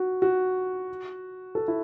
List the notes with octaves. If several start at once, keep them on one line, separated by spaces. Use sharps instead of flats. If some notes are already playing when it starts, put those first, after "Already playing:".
Already playing: F#4
F#4
A4
E4